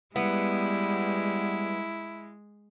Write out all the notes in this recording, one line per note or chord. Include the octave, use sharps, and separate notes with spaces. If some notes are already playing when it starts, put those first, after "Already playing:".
G3 G#3 B3 E4